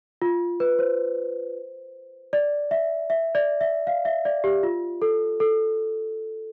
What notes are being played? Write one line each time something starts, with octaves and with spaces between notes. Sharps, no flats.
F4
B4
C5
D5
E5
E5
D5
E5
F5
E5
D5
G4
F4
A4
A4